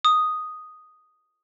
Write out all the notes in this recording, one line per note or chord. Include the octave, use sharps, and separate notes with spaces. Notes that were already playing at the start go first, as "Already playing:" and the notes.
D#6